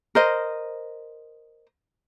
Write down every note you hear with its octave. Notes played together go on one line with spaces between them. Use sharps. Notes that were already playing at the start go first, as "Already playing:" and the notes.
A#4 C5 D#5